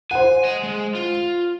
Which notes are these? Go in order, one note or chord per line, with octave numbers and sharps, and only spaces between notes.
C5 F#5 G#5
D#5 G#5
G#3
F4